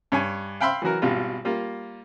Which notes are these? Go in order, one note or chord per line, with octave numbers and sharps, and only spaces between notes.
G2 C#5 G#5
F5 G5 B5 C6 E6
E3 F#3 F#4 A#4
G#1 B2 G3 F4
G3 A#3 F4